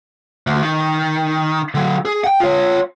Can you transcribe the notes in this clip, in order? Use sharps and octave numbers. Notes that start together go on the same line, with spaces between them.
D2
D#3
D3 F#3
G#4
F#5 G5
F4 C#5